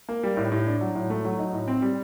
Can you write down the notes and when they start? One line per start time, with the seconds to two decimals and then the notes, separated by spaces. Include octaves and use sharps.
0.09 A#3
0.23 G3
0.37 A2
0.52 A2
0.67 D4
0.81 F#3
0.95 A2
1.10 A3
1.25 F#3
1.39 D#4
1.53 A2
1.68 C4
1.82 G3